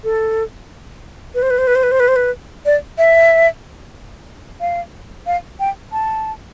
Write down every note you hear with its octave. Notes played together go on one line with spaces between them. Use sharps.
A4
B4
C5
B4
C5
B4
C5
B4
C5
B4
C5
B4
D5
E5
F5
F5
G5
A5